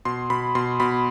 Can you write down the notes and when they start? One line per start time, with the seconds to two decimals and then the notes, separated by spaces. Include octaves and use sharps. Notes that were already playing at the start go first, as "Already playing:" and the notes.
0.05 B2 C6
0.30 B2 B5
0.55 B2 C6
0.80 B2 B5